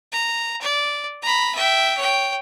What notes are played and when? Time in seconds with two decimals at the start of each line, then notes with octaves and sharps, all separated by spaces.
0.12 A#5
0.62 D5
1.22 A#5 B5
1.55 E5 G5
1.98 C#5 G5